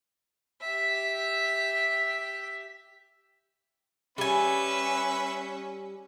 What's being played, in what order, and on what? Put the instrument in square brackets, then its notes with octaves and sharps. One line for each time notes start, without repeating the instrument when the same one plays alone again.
[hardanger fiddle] G4 E5
[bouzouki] G3 G#5 [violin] C#4 [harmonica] B4 E5